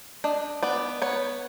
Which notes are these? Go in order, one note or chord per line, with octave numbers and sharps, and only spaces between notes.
D4 D#5
B3 D5
B3 C#5